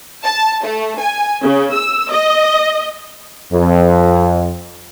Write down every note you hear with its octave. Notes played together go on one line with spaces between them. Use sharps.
A5
A3
G#5
C#3
E6
D#5
F2